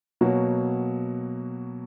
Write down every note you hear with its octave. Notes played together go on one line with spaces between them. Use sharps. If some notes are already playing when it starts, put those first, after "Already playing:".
B2 F#3 A#3